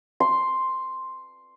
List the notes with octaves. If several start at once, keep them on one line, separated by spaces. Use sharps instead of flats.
C6